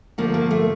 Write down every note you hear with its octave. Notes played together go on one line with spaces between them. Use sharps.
D3 F3 A3 A#3
A#3
A3